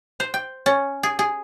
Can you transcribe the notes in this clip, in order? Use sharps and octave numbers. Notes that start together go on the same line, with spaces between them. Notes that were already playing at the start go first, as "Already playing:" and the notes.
C5
G5
C#4
G#4
G#4